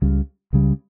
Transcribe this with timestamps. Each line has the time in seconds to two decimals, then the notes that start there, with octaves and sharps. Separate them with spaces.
0.02 C#2 C#3 G3
0.53 C#2 C#3 G3